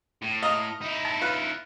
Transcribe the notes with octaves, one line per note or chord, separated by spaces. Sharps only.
A2
D#5 F5 A#5
D#4 E4
A5
F4 B4